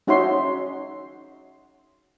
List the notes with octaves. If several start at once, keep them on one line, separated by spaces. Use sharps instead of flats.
C#4 D#4 F#4 C#5 E5 C6